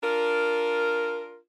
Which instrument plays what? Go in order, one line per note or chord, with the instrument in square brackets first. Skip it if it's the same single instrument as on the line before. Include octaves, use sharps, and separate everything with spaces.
[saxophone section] D4 F4 A#4